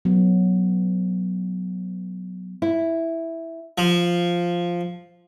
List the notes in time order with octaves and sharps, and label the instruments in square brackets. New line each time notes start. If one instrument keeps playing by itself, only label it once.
[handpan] F#3 B3
[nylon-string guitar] E4
[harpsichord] F3